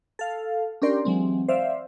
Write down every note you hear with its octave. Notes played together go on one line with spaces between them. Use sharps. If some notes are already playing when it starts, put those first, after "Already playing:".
A4 F5
C#4 D4 G4 A#4 D5 C6
E3 F#3 G#3 C4
C5 D5 E5 F5